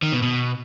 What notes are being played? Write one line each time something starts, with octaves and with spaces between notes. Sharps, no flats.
D#3
B2
B2